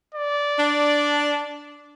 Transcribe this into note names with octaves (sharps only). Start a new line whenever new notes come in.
D5
D4